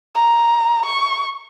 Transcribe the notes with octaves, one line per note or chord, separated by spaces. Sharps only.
A#5
C#6